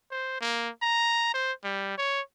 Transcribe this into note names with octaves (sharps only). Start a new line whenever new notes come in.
C5
A#3
A#5
C5
G3
C#5